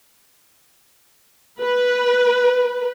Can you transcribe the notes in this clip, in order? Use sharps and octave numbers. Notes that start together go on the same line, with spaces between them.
B4